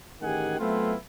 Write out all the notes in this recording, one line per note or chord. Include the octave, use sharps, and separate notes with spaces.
A1 D#3 G4 G#4 F#5 G#5
F#3 A3 B3 C4 E4 F4